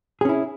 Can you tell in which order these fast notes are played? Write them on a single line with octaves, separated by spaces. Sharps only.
G#4 C#4 E4